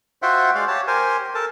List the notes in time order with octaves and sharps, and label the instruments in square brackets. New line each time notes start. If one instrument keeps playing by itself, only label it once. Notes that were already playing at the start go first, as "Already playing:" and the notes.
[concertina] F4 F#4 C5 E5 F#5 G5
G#3 F#4 D5 F5
G4 C#5 A5
G4 A#4 C5 G#5
A4 A#4 A5